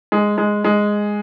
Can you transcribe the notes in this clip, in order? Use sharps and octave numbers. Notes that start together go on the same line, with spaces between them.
G#3
G#3
G#3